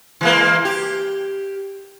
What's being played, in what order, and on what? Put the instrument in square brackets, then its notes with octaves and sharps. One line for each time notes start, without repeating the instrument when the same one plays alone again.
[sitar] E3 G#3 A#3
G4